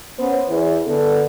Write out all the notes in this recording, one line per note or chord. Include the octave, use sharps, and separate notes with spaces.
B3 C#4 C5
E2 E4
D3 B3 A4